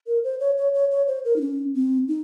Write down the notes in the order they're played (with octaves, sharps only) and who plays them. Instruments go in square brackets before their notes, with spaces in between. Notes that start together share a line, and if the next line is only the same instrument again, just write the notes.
[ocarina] A#4
C5
C#5
C#5
C#5
C#5
C5
A#4
D#4
C#4
C4
D#4